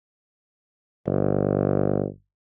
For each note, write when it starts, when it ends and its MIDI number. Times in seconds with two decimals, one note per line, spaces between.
1.07 2.06 31